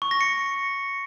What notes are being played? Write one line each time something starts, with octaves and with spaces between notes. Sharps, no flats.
C#6
A#6
C#7